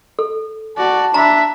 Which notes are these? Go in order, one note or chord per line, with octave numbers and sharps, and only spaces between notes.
A4
F#4 D5 A5
D4 E5 A#5 B5